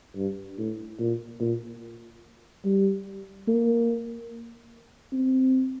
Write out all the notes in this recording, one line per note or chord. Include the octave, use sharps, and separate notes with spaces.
G2
A2
A#2
A#2
G3
A#3
C4